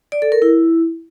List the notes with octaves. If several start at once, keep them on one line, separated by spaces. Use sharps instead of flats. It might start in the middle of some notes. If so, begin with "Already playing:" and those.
D5
A4
A#4
E4